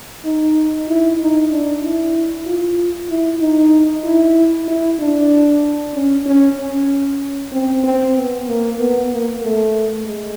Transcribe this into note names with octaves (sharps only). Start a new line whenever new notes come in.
D#4
E4
D#4
D4
E4
F4
E4
D#4
E4
E4
D4
C#4
C#4
C#4
C4
C4
B3
A#3
B3
A#3
A3
G#3